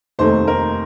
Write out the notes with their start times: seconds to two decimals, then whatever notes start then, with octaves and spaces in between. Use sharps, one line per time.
0.19 F1 D#2 D#3 A3 C5
0.48 A#4